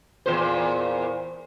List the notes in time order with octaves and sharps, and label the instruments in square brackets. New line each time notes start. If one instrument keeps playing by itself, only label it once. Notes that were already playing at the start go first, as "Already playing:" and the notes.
[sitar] E2 A#2 C5